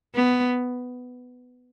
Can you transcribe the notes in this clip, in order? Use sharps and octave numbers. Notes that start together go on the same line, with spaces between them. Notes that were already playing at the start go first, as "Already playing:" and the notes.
B3